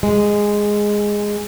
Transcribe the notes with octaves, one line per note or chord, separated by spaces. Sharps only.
G#3